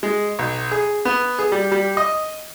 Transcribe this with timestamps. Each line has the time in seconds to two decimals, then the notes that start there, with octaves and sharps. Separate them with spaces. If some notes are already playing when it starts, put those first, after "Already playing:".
0.03 G#3
0.39 B1
0.72 G#4
1.05 B3
1.39 G#4
1.52 G3
1.72 G3
1.97 D#5